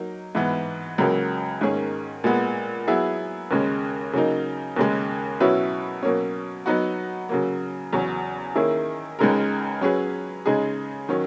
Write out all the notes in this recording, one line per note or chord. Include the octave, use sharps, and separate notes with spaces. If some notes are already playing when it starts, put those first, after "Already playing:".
Already playing: F#3 A#3 D#4
G#2 E3 B3
C#2 C#3 F#3 A#3
G#2 D#3 A#3 C#4 G#4
A#2 G#3 B3
F#3 B3 E4 G#4
D#2 C#3 G#3 C#4
C#3 F#3 A#3 D#4
D#2 C#3 G#3
B2 F#3 C#4 E4 B4
B2 F#3 A#3 C#4
F#3 B3 D#4 F#4
C#3 F#3 A#3
E2 C#3 F#3 C#4
D#3 A#3 C#4 E4 G#4
C#2 C#3 G#3 D#4 A#4
F#3 C#4 G#4 B4
C#3 G#3 D#4 G#4
D#3 F#3 C#4